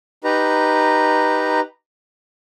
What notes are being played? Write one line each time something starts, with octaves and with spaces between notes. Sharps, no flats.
D#4 G4 B4 A#5